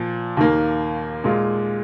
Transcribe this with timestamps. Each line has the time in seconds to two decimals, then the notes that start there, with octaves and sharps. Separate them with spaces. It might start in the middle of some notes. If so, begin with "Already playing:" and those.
Already playing: A#2 F3
0.37 D#2 D#3 A#3
1.24 A#2 G#3 F4